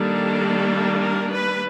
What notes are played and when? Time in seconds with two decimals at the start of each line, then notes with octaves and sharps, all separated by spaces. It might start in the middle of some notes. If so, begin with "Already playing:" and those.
Already playing: D#3 G3 A#3 D4 A4
1.02 A#4
1.31 B4